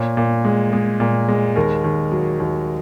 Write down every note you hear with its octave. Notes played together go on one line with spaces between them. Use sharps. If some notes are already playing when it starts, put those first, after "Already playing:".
Already playing: A#2 C#5
A#2
G#3
G#3
A#2
G#3
D#2 A#4
D#2
F#3
D#2